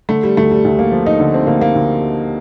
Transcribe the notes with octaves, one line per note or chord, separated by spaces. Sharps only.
D3 A3
G3
D2 A3
G3
D2
A#3
F3
D#4
D3
C4
D2 A#3
A#3
D2